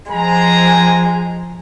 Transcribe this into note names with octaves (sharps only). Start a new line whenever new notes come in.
F3 G#3 C4 G#5 A#5